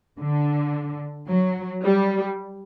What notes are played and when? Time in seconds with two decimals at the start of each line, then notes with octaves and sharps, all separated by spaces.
0.19 D3
1.28 F#3
1.83 G3